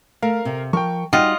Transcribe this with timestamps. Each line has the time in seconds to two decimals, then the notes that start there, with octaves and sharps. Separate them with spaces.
0.22 A3 A#4 F5
0.45 C3
0.73 F3 A#4 G5 C#6
1.13 G3 D#4 F4 F#4 D#5 F#5 G5